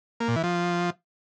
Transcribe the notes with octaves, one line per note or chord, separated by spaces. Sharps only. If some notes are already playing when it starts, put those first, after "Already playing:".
A#3
A#2
E3
F3